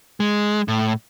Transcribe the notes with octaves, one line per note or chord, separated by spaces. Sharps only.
G#3
A2